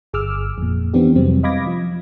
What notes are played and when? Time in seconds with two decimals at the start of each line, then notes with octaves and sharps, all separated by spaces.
0.13 G1 G#4 D6 E6 F6
0.58 F2 A#2
0.94 D#3 E3 B3 C4 D4 G4
1.16 F2 C3 F#3 G3 C4
1.43 D#5 F5 B5 D6 G#6 A#6
1.67 F3